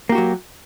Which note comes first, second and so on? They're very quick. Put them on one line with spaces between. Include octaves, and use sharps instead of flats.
A#3 G4 F#4 F#3